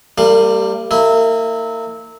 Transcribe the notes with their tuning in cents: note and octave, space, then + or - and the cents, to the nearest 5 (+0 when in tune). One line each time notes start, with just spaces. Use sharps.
G3 +0 A#3 -45 F5 +0
A#3 -35 E4 -20